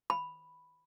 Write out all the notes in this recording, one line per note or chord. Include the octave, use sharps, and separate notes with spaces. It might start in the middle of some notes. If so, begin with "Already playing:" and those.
B5